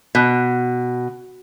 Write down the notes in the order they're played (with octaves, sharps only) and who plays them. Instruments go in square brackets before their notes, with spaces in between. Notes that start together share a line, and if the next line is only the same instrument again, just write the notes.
[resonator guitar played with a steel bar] B2